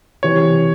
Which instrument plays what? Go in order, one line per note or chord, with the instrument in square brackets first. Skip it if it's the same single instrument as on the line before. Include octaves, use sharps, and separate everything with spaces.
[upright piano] C3 E3 [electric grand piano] C#5